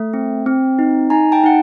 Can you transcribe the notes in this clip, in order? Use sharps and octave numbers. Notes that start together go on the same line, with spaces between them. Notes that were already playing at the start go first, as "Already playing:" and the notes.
Already playing: A3
C4
C4
D#4
D#4 G#5 A#5
G5 A5
D#4 F#5